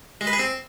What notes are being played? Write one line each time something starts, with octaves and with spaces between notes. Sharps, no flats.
G#3
B4
G#4
C4